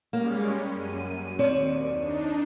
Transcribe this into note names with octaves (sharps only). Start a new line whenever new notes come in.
G3 G#3 A#3 C#4
F#2 D#7
D#2 C4 C#5 D5
D4 D#4